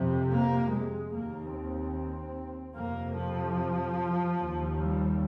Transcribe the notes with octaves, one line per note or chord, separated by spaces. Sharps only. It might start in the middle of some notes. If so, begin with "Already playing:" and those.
Already playing: F2 C3
A#3
G#3
D#2 A#3
C4
F2 C3 A#3
F3
D#2
G3